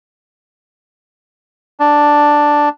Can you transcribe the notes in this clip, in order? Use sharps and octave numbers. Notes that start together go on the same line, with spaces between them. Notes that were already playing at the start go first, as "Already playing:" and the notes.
D4